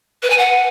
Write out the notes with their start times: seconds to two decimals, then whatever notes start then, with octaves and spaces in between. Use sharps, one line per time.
0.23 B4
0.30 G#5
0.38 F#5